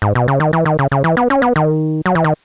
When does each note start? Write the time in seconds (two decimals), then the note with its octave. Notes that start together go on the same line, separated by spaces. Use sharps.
0.02 G#2
0.15 B2
0.28 C#3
0.40 D#3
0.53 E3
0.66 D#3
0.79 C#3
0.92 C#3
1.04 E3
1.17 B3
1.30 C#4
1.42 B3
1.56 D#3
2.06 F#3
2.15 E3
2.24 D#3